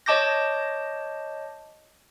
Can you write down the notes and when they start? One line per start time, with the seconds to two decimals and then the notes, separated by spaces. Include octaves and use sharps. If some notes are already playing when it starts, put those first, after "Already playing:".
0.06 C#5 D#5 A5 D6 G6 A#6